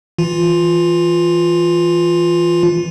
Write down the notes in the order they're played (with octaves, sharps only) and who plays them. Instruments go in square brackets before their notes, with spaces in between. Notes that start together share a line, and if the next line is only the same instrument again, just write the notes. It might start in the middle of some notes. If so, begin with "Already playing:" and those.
[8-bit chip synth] E3 F4